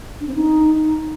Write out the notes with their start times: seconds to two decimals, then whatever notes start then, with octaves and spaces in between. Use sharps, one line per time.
0.21 D4
0.28 C4
0.35 D#4